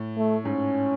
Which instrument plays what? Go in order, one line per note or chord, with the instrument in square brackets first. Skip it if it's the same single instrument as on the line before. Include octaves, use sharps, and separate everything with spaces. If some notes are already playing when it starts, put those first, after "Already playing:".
Already playing: [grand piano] A2
[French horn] A3
[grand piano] G#2 [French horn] C#4